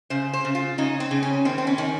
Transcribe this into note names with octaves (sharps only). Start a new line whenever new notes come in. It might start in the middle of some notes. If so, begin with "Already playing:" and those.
C#3 C5
C5
C#3
F4
C#3 D#4
C4
C#3
C#4
D#3 C4
C4
C#4
D#3